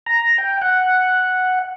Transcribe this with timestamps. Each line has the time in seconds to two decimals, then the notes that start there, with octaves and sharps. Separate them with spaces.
0.06 A#5
0.38 G5
0.62 F#5